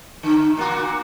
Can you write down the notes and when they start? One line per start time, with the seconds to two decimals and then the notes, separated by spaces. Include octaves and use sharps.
0.23 D3
0.57 A#2 A#3 F#4